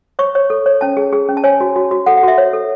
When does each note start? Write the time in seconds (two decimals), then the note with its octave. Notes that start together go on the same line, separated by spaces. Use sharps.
0.19 C#5 C#6
0.35 C#5
0.50 A4
0.66 C#5
0.81 C#4 A5
0.97 G#4
1.13 G#4
1.29 C#4
1.37 A5
1.44 C#5 G#5
1.61 F#4
1.76 F#4
1.91 F#4
2.06 A4 F#5
2.17 F#5
2.23 F#4 E5
2.38 C#5
2.53 A4